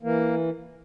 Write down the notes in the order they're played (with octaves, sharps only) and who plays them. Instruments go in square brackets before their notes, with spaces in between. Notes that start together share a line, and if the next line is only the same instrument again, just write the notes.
[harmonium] E3 A#3